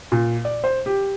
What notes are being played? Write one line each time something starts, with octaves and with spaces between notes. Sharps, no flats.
A#2
D5
C5
G4